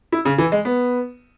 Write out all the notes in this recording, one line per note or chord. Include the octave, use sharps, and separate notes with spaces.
E4
C#3
E3
G#3
B3